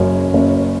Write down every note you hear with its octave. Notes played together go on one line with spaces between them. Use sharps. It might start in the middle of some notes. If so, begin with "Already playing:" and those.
Already playing: F#1 F#2 C#3 C#4
F#1